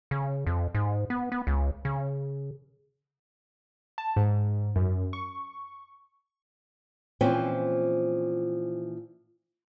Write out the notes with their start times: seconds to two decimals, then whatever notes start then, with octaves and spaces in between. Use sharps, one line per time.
0.11 C#3
0.47 F2
0.75 G#2
1.10 B3
1.32 B3
1.47 C#2
1.85 C#3
3.98 A5
4.16 G#2
4.76 F#2
5.13 C#6
7.21 A#2 E3 F3 C4 C#4 C5